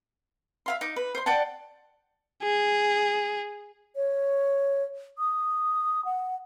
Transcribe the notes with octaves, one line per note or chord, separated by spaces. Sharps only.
E5 F5 C6
D#4 D6
B4
C5 C6
D5 F#5 G5 A5
G#4
C#5
D#6
F#5